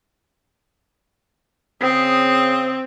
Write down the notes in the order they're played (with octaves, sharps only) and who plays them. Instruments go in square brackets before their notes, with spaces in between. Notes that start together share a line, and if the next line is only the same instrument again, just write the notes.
[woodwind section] C#3 D#6 [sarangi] C4